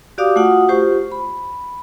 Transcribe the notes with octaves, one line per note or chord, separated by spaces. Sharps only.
F#4 G4 D5 F5 D6 D#6
A3 F4 F#4 F#5 D#6
F4 G4 C5 C#6
B5